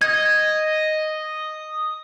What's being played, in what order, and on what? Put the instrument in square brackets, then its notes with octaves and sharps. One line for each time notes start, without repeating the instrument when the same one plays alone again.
[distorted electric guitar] D#5 [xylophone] G#6